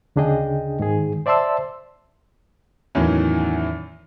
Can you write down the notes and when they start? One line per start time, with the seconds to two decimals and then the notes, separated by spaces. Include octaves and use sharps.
0.16 D2 C#3 D4 G#4 D#5 G5
0.80 G#2 D#3 G#4
1.26 C5 D5 E5 A5 C6 E6
2.95 E2 A2 D#3 E3 F#3 C#4